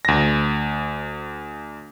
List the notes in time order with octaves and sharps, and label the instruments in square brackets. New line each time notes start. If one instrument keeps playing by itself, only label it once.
[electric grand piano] D2 A#6